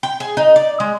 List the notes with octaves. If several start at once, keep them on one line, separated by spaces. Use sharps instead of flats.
G5
G#4
D#4
D5
G#3